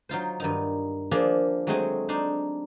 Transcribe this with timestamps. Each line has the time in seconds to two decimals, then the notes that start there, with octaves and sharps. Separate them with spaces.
0.09 F#3 D#4 F4 C5
0.40 G2 D#3 D#4
1.11 F3 A#3 D4 G#4 A#4
1.67 F#3 G#3 A3 C4 F#4 G#4
2.09 D4 D#4 C5